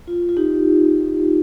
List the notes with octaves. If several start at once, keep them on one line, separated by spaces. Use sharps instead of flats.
F4
F4
D#4 G4